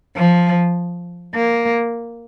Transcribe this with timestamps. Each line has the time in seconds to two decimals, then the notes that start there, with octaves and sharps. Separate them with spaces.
0.17 F3
1.35 A#3